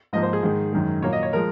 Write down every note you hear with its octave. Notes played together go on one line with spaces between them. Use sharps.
G#2 F3 A#3 D#5
C5
G#4
G#2 D#3 G#3
F#2 D#3 G#3
A#2 F#3 A#3 C#5
D#5
C#5
F3 G#3 A#4